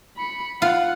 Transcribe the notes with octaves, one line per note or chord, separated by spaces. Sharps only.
B5 C#7
F4 F#5